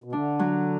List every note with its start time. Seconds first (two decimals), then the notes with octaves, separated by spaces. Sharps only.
0.04 B2
0.13 D3 D4
0.39 F#3